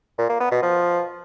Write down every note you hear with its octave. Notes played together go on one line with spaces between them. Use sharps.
A#2
A#3
B3
B2
F3